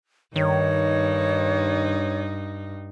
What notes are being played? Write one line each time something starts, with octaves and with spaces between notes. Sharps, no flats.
G2 D#3 D#4 C#5